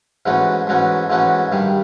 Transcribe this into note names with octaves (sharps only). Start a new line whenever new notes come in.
G#2 E3 A3 C#4 F#4
G#2 E3 A3 C#4 F#4
G#2 E3 A3 C#4 F#4
G2 D#3 G3